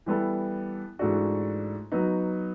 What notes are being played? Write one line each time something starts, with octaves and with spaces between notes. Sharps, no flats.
E3 G3 B3 E4 A4
G#2 E3 A3 D4 F#4
F#3 B3 D#4